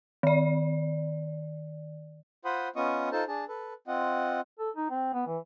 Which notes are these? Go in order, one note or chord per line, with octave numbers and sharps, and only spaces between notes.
D#3 D5
F4 C5 F#5 B5 C6 D#6
B3 C#4 F4 D#5 C#6 D#6
D#4 F4 A4 C5 A5
D4 G#4 A5
A4 B4
C4 F4 D#5 F#5
A4
D#4
C4
B3
E3